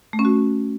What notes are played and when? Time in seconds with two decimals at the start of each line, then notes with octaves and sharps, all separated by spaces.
0.13 A3
0.19 C#4
0.25 F#4